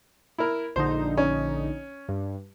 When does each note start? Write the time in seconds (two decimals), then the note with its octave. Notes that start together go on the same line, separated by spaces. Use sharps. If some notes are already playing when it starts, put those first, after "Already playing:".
0.38 E4 A#4
0.76 A#1 D3 D#4 C5
1.17 C#4
2.08 G2